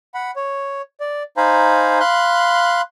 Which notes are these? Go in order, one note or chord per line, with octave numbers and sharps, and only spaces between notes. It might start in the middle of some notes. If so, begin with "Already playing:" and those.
F#5 B5
C#5
D5
D#4 C5 F5 G#5 A#5 B5
F5 B5 C6 F#6